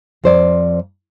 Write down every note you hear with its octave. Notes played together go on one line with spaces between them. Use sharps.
F2 C5 D5